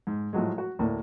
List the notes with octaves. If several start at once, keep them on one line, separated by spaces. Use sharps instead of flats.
G#2
A2 F3 F#3 G#3
F#4
D2 A2 A#3